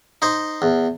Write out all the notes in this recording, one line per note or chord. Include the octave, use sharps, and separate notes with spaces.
D#4 C5
E2